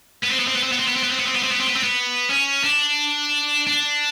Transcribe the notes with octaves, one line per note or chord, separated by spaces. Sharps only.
B3
C4
B3
C4
B3
C4
B3
C4
B3
C4
B3
C4
B3
C4
B3
C4
B3
C4
B3
C4
B3
C#4
D4
D4